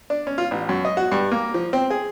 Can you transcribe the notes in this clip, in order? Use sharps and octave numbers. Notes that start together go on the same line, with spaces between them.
D4
C#4
F4
A1
F#2
D#5
F#4
G2
A#3
F3
C4
G#4